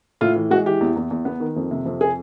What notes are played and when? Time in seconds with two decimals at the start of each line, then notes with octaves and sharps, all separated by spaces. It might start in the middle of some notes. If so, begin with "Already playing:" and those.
0.21 A2 F4
0.35 E3
0.51 G#3 F#4
0.66 E3 G4
0.81 E2
0.96 E2
1.11 E2
1.25 B3
1.40 D#3
1.56 F2
1.71 C3
1.86 F2
2.01 G#4